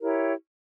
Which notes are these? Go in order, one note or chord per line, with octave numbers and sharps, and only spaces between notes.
E4 G4 A#4 C#5